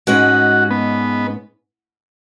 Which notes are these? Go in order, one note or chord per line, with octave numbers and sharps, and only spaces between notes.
G#2 G#3 C#4 F#4 B4 D#5
B3